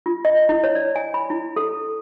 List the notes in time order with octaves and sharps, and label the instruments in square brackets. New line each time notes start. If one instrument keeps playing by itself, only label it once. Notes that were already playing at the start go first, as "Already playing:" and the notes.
[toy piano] F4
D#5
E4
C#5
D5
G#5
B5
E4
A4